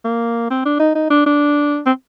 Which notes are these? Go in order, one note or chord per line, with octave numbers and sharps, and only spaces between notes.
A#3
C4
D4
D#4
D#4
D4
D4
C4